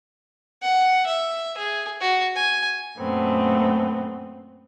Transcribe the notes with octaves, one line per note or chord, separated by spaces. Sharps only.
F#5
E5
G#4
F#4
G#5
F#2 A#2 A3 B3 C4